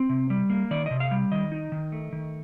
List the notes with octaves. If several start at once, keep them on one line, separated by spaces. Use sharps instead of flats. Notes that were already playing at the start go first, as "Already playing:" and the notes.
Already playing: C4
C3
G3
A#3
D#3 D5
C3 D#5
F5
G3
D#3 D#5
D#4
D#3
A3
D#3